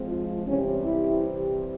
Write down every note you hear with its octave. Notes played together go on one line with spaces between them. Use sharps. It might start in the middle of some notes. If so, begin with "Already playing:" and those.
Already playing: F3 G#3 C4
F4
C3 E3 G3 C4 C#4
E4